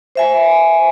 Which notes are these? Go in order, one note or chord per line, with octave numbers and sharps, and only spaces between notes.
C5 E5 G#5